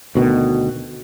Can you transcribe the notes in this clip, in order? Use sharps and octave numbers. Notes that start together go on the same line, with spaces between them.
D2 B2 D#3